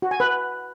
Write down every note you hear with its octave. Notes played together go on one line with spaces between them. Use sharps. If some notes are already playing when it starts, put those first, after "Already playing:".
F#4
G#5
B4